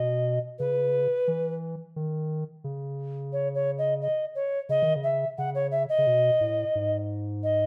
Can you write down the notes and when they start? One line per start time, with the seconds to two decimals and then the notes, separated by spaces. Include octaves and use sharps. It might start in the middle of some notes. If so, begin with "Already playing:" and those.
Already playing: B2 D#5
0.59 C#3 B4
1.28 E3
1.96 D#3
2.64 C#3
3.33 C#5
3.55 C#5
3.78 D#5
4.02 D#5
4.35 C#5
4.69 C#3 D#5
4.82 D#3
4.96 C#3
5.03 E5
5.38 C#3 F#5
5.55 C#5
5.71 E5
5.89 D#5
5.98 C#3
6.07 B2
6.41 A2
6.75 G#2
7.43 D#5